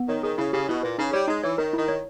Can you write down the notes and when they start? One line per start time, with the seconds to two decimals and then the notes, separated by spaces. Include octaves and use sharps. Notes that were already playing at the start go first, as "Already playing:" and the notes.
Already playing: B3
0.09 D#3 C#5
0.23 D#3 G#4
0.38 C#3 E4
0.53 C#3 G4
0.69 B2 E4
0.83 A#2 B4
0.98 C#3 D#4
1.13 G3 C#5
1.28 G#3 D#4
1.44 E3 C#5
1.58 D#3 A#4
1.73 D#3 E4
1.88 C#5